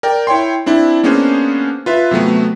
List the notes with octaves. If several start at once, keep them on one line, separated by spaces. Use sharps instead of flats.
A#4 D5 G5
E4 C#5 G5 C6
C4 D4 E4
A#3 B3 C#4 D4 G#4 C5
F4 B4 E5
C3 F#3 A3 B3